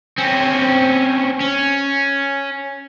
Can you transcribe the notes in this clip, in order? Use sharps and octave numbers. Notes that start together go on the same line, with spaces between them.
C4 C#4
C#4